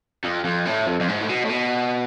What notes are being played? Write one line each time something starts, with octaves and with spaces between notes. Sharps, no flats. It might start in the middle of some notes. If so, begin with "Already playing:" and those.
F2
F2
A2
F2
F2
G#2
A2
B2
A2
B2